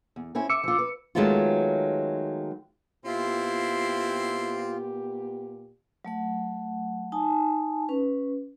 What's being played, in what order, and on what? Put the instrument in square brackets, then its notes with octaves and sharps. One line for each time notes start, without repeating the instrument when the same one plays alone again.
[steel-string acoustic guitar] E2
C4 C#4 E4
[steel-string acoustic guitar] E5 [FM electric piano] D6 E6 C#7
[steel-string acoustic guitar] F3 F4
B4
[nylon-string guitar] D#3 F#3 G#3 A3 B3 F4
[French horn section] A#2 B3 G4 [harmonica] C4 E4 C6 [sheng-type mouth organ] F4
[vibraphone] F#3 A3 F#5
D#4 G#5 A5
C#4 B4